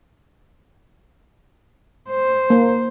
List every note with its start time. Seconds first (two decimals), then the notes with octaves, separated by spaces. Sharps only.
2.11 C5
2.50 A#3